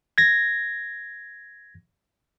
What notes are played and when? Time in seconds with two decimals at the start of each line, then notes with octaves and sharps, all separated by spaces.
0.18 G#6 A#6